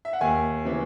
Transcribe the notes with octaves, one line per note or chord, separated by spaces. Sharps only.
E5
F#5
D#2 G#5
C#3 E3 B3